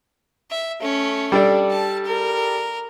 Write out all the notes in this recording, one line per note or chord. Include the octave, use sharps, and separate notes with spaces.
E5
A3 C#4
G3 D4 A4 D5
A5
A#4